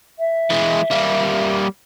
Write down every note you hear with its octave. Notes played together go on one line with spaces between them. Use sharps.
E5
E3 G#3
G3 A#3